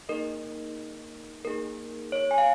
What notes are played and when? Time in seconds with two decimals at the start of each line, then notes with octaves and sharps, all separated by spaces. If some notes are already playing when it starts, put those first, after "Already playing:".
0.09 A#3 D#4 G#4 A#4 D#5
1.45 A#3 D#4 G#4 A#4
2.12 C#5
2.31 G#5
2.38 F5